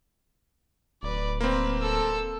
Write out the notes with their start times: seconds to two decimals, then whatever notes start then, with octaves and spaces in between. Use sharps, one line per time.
1.03 D1 B4 D5
1.41 A#3 C4 B4
1.82 A4 E6